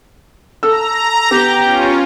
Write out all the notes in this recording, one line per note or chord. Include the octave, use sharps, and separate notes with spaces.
A4 A#5 E6
B3 G4
C#4 F4